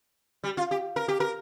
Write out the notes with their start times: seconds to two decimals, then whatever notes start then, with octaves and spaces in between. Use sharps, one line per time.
0.44 G3
0.57 F4
0.71 G4
0.96 A#4
1.08 G4
1.20 A#4